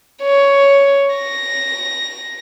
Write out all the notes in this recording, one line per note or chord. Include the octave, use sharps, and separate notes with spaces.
C#5
A#6